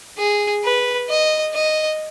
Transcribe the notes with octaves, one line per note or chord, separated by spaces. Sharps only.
G#4
B4
D#5
D#5